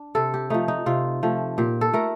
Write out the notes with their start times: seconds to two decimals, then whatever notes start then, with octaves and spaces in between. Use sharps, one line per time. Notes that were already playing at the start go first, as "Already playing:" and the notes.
Already playing: D4
0.15 C3 A4
0.34 G4
0.50 F3 A3 D#4
0.68 D#4
0.86 C3 F4
1.23 F3 A3
1.58 A#2 G4
1.81 A4
1.93 A3 A#4